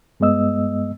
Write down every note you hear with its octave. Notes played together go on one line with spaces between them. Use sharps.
G2 G#3 B3 D#5 E6